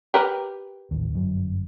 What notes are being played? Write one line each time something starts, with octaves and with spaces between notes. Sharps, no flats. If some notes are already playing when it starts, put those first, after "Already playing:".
G4 A#4 B4
A1 D#2
G1 F#2 F#3